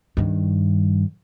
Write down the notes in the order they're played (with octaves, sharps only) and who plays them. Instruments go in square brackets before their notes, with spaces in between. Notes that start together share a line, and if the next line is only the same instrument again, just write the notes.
[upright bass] G2 D#3